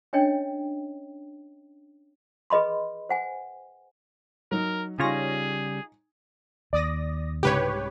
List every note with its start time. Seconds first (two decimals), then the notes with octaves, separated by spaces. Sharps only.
0.13 C#4 D4 C#5 D#5 G5
2.50 G#4 B4 D#5 B5 C6
3.09 C5 F#5 G#5
4.51 F#3 D#4 A#4
5.00 C#3 G3 D#4 F4 G#4 C#5 G#5 A#6
6.73 D#2 D5 D#6 A#6
7.43 C2 G#2 C#3 G4 B4 C#5